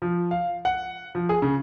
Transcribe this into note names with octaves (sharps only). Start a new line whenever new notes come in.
F3
F5
F#5
F3
G#4
C#3